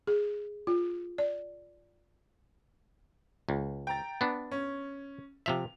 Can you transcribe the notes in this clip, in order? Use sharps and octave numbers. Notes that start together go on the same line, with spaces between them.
G#4
F4
D5
C#2
G5 A#5 A6
B3 D4
C#4
C3 F3 E5 F7